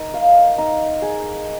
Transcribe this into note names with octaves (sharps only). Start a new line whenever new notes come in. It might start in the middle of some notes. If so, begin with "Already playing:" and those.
Already playing: D#4 A#4
F5
D#4
G#4